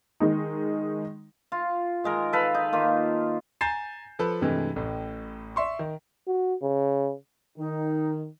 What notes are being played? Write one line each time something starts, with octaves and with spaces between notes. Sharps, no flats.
D#3 G#3 D#4
F4
D#3 G#3 A#4
A4 B4 F5
D#4
D#3 A#3 F4
G#5 A#5 G6 A6 C7 E7
F3 A4 B4
G2 C3 E3 G#3 A3
A1 A2
D5 E5 C6 C#6
D#3
F#4
C#3
D#3 D#4